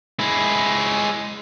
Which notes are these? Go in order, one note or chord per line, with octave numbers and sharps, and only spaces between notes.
G#3 E4